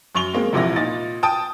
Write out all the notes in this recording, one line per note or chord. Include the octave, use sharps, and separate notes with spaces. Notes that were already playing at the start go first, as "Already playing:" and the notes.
F#2 C#6 F7 G7
G#3 A#3 C4
E1 A#1 C3 E4 A#6
A#2 D#4 A6
G5 A5 D#6